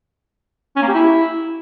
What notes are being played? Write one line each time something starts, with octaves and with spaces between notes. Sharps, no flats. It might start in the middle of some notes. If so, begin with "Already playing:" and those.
C#4
A#3
G4
E4